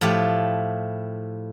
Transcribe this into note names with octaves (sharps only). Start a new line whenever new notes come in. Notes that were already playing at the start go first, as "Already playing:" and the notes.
A2 F3 E4 G4